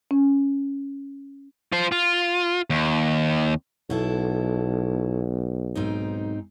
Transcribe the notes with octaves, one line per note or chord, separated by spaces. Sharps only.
C#4
F4 C5
F4
D#2
B1 B2 E4 A4
G#2 C4 D#4